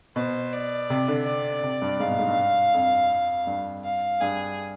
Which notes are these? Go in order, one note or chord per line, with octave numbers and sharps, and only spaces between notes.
B2 C5
D5
C3
D3
D5
C3
G2
G#2 F5
B2
G#2
G2
F2
G2
F5
G2 G#4